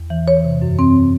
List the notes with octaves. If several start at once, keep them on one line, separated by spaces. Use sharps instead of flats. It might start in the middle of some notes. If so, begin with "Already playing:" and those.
Already playing: E2
E3
E3 C#5
C3
F#2
C4